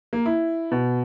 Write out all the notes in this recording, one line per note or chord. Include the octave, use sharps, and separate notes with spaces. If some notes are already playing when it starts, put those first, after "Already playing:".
A#3
E4
B2